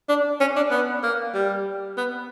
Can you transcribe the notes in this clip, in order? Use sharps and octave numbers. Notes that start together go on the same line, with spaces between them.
D4
C#4
D4
B3
A#3
G3
B3